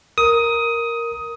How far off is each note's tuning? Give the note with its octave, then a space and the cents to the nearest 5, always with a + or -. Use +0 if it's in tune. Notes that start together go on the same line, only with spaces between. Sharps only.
A#4 +0 D#6 +15